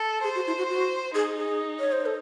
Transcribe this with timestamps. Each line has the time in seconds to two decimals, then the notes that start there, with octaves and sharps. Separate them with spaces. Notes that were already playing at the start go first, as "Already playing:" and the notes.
Already playing: A4
0.24 G#4 C5
0.35 F#4
0.47 E4
0.58 F#4
0.70 F#4
1.15 D#4 G#4
1.38 G#4
1.80 C#5
1.92 C5
2.06 A4